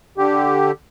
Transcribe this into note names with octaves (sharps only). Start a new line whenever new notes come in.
D3 G4